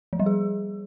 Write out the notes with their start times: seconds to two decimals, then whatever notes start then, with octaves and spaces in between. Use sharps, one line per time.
0.13 F3
0.19 G3
0.26 G#4